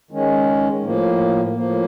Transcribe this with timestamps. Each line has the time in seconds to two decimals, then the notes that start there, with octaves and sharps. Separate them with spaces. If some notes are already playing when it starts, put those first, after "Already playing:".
0.11 D#3 G#3 C#4
0.83 A2 F3 A#3
1.56 A2 F3 A#3